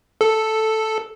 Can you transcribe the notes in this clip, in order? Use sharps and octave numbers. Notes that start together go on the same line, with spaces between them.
A4